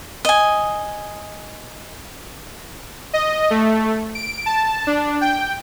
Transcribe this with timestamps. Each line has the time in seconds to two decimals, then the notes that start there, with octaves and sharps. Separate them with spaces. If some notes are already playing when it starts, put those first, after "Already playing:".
0.25 D#5 G#5
3.13 D#5
3.50 A3
4.15 D7
4.46 A5
4.87 D4
5.21 G5